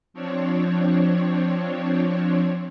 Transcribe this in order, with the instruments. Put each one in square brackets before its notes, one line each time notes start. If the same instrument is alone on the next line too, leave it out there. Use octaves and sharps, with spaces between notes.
[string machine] F3 C4 D4 C#5